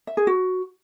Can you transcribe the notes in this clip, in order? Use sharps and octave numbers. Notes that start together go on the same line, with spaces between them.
E5
G#4
F#4